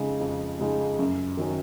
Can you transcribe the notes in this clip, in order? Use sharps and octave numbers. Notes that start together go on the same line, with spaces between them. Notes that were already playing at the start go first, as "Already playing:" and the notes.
Already playing: F2 C#3 G#3 D#4 G#4
F2
C#3 G#3 D#4 G#4
F#2
D#3 F#3 C#4